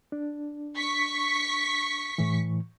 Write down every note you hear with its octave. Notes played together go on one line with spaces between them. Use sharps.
D4
C#6 B6
A2 E3